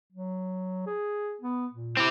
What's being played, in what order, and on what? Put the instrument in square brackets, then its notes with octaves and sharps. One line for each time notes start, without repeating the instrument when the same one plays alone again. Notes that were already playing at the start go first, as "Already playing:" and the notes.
[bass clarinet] F#3
G#4
B3
A#2
[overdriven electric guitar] C4 G4 [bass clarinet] E4